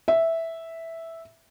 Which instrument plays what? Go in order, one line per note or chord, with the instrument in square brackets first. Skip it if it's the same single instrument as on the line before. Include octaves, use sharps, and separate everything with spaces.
[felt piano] E5